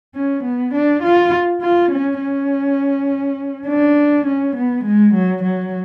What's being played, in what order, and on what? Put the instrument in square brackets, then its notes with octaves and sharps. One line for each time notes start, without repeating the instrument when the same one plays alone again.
[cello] C#4
B3
D4
F4
F4
C#4
C#4
D4
C#4
B3
G#3
F#3
F#3